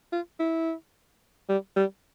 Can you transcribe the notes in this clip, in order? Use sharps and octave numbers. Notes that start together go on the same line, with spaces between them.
F4
E4
G3
G3